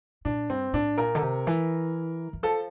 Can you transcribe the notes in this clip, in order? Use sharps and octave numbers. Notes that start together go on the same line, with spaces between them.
A#2 D4
G2 C4
A2 D4
A#2 A#4
D3
C3
E3
E3
F3 A4